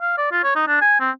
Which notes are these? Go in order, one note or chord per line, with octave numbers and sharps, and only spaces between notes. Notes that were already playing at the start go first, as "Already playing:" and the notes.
F5
D5
F4
C#5
D#4
D4
G#5
C4